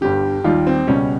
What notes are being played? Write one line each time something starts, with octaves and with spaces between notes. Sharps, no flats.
G1 G2 D3 G4
D#2 D#3 G3 F4
C4
C#2 B2 G3 C#4